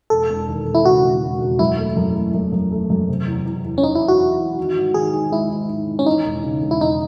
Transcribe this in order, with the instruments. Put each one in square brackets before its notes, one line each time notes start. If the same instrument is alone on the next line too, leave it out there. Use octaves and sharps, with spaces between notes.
[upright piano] E1 [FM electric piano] A4
[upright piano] E1
D#2
E1
[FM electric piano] E4
[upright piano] C#3 [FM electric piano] F#4
[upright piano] E1
E1
E1
[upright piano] F#2 [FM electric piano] E4
[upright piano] A3
F#2
A3
F#2
F#2
A3
F#2
C3
E2
E2
E2
[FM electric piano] C#4
[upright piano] E3 [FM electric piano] D#4
[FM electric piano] E4
[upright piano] E2
[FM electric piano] F#4
[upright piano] E2
E3
D#3
G#2
[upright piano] D#3 [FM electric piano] G#4
[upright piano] G#2
[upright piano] G#3 [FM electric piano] E4
[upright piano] G#2
G#2
D#3
[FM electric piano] C#4
[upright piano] E3 [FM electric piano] D#4
[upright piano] E1
C#3
E1
[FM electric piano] E4
[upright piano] E2 [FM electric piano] D#4